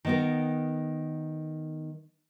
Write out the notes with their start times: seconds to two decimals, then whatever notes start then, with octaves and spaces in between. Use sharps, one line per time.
0.05 D#3 B3 A#4